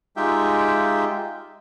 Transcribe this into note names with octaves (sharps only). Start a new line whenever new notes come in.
G#3 D#4 F4 G4 E5 G5